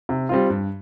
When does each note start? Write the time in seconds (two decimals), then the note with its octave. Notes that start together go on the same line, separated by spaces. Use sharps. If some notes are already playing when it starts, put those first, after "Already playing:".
0.09 C3
0.29 G3 C4 F4
0.50 G2